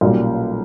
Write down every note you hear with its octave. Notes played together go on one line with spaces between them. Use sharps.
B1 A#2 G3 A#3 C#4